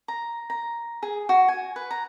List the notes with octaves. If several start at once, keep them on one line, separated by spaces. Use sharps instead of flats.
A#5
A#5
G#4
F#4
G#5
B4
A#5